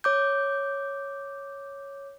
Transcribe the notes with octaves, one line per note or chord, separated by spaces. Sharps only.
C#5 D6 G6